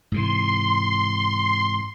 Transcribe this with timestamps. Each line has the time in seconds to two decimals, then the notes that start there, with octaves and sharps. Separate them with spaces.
0.12 G#2 C3 E3 C6